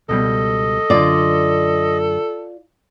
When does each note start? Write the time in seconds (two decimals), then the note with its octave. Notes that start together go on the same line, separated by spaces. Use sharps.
0.09 C#2 B2 G3 A4 D#5
0.90 F#2 D3 F4 D5